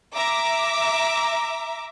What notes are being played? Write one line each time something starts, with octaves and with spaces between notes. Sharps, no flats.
E5 A#5 D6